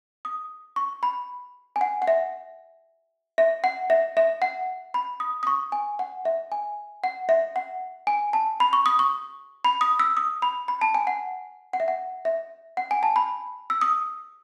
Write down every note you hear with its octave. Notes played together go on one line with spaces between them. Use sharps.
D#6
C#6
B5
G#5
F#5
F#5
E5
E5
F#5
E5
E5
F#5
B5
D#6
D#6
C#6
G#5
F#5
E5
G#5
F#5
E5
F#5
G#5
A5
B5
C#6
D#6
C#6
B5
D#6
E6
D#6
B5
B5
A5
G#5
F#5
F#5
E5
F#5
E5
F#5
G#5
A5
B5
E6
D#6